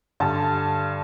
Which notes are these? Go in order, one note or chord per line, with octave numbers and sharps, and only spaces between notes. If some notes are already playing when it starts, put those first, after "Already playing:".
G2 D3 A5